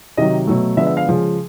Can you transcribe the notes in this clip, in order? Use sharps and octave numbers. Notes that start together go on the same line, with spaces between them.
C3 D#3 F#3 D#5
B2 F#3 A3
D3 F3 G#3 B3 E5
E5
F5
C#3 F3 G#3